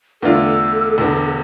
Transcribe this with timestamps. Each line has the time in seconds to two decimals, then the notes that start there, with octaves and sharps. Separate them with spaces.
0.22 E2 D3 A3 D4 F4 A4
0.98 E1 E2 D3